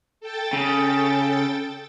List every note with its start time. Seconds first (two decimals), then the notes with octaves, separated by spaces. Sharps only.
0.21 A4 G5 A6
0.53 C#3